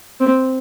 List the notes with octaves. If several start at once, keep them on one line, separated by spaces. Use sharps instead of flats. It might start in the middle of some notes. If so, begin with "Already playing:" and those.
C4